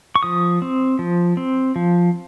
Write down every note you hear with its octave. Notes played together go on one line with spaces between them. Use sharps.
C#6
F3 D#6
C4
F3
C4
F3